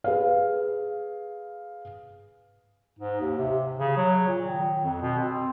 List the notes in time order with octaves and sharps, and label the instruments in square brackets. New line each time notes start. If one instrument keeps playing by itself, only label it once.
[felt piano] G#4 B4 F5
[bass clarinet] G#2
D#2
C3
C#3
F#3
A#2
D#3
F2
B2
C4